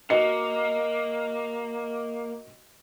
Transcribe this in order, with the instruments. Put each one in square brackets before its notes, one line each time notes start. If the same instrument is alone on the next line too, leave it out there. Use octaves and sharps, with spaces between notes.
[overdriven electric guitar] A#3 [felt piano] F#4 D#5 C#7